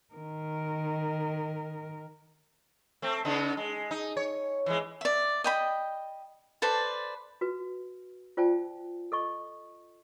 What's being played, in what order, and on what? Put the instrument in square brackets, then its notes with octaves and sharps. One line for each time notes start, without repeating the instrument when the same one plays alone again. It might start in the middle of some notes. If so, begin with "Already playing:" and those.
[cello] D#3 A#4
[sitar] A3 C4
C#3 B3 D#4
G#3
D#4
C#5
E3 G#3
[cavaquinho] D5 E5
D#5 G5 B5
A4 B4 C5 D5
[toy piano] F#4 B4
F4 C5 D5 G5 A5
A4 D#5 C#6